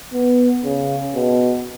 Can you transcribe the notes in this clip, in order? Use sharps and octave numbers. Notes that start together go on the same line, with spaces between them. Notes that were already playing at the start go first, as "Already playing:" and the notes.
B3
C#3
B2